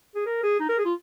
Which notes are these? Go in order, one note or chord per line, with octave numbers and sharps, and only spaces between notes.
G#4
A#4
G#4
D#4
A#4
G#4
F4